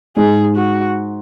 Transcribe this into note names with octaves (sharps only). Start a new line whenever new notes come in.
G#2 G#4
F#4